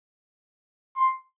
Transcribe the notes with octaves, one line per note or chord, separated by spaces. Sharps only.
C6